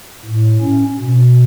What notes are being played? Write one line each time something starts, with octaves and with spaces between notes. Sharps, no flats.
A2
C#4
B2